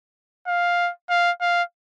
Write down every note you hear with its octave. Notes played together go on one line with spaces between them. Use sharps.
F5
F5
F5